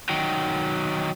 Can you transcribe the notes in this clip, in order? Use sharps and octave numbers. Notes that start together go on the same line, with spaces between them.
D#3 F#3